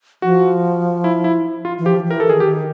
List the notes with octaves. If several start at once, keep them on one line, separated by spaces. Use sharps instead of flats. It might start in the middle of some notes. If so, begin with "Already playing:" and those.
F3 F#4
E4
E4
F4
E3
F3 G4
E3 A#4
A4
D#3 G#4
G4
D#3